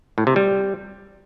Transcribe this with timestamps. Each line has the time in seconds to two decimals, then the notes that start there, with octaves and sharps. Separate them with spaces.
0.18 A2
0.27 C3
0.36 G3